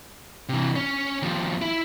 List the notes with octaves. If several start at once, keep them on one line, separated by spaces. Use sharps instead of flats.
C3 E3
C#4
D#2 F3
E4